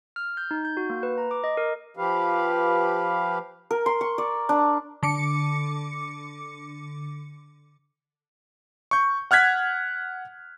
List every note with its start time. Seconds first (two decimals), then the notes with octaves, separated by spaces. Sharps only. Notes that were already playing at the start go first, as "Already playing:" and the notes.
0.16 F6
0.37 G6
0.51 D#4
0.65 G6
0.77 F#4
0.90 A#3
1.03 B4
1.18 A#5
1.31 D6
1.44 D#5
1.57 A#4
1.97 F3 G4 B4 F5
3.71 A#4
3.86 C6
4.01 C#6
4.18 D5
4.49 D4
5.03 D3 D6 C#7
8.91 C#6 G6
9.31 F#5 F6 F#6 G#6 B6